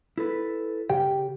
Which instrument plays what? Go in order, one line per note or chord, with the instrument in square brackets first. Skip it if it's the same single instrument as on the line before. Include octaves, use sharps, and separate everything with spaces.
[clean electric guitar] E4 A4 B4
[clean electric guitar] C#3 [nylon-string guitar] G4 [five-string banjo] G5